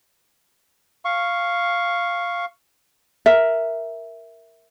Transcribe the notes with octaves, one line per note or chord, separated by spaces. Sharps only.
F5 C#6
A#4 E5